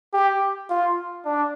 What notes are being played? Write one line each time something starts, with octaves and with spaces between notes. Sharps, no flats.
G4
F4
D4